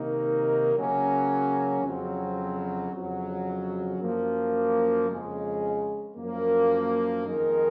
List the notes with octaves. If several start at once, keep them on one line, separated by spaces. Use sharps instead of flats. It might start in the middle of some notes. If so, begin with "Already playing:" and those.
Already playing: C3 D#3 A#3 D#4 A#4
C#3 F#3 A#3 C#4
F2 C#3 F#3 C4
F2 C#3 F#3
F#2 F3 A#3
F2 C#3 G#3
F#2 F3 A#3
F2 D#3 G#3 D#4 A#4